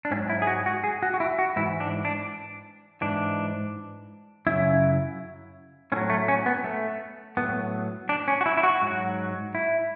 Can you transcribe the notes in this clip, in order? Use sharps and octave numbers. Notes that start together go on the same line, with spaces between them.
D4
G#2 F#3 C#4
E4
G#4
F#4
F#4
G#4
F#4
F#4
E4
F#4
G#2 E3 E4
D4
D4
G#2 E3 D4
F#2 C#3 F#3 E4
A2 F#3 C#4
A3
C#4
B3
A3
A2 F#3 B3
D4
C#4
F#4
E4
E4
F#4
G#2 F#3
E4